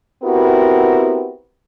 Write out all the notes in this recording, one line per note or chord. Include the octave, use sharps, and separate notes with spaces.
B3 C4 E4 F#4 G4 A#4